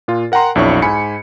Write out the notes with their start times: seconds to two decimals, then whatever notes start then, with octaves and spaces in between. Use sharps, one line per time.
0.08 A#2 F4
0.32 A#4 F#5 G5 A#5 C6
0.55 B1 F2 D4 E4 C#5 C#6
0.82 G#2 G#5 B5 C#7